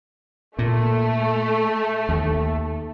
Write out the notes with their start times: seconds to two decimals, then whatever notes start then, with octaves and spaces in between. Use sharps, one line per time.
0.59 A#2 A3
2.09 D#2